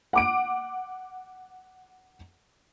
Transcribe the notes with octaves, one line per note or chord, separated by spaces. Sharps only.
F#5 D6 D7